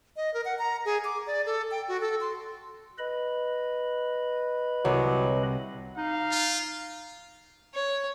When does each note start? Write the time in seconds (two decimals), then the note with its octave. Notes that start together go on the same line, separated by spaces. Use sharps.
0.16 D#5
0.34 A#4
0.45 F#5
0.59 A#5
0.85 G#4
1.04 D6
1.27 D5
1.46 A4
1.71 G5
1.88 F#4
2.01 A4
2.21 C6
2.98 B4 D#5 B5
4.85 C2 F#3
5.97 D#4 F5
6.31 F4
7.74 C#5